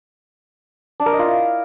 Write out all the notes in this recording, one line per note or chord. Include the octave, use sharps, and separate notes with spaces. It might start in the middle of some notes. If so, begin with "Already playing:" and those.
D4
A#4
D#5
F4
E4